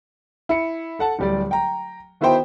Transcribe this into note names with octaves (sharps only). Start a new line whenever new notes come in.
E4 C#7
A4 F#5 A5
D1 G3 D5
G5 A#5
D#3 B3 E4 F#4 C5 G5